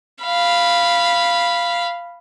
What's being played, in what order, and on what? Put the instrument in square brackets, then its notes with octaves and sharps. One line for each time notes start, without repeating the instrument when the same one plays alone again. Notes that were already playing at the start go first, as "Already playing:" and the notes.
[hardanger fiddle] F5 B5